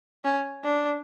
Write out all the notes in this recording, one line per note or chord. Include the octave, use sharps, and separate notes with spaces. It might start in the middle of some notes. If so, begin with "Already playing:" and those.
C#4
D4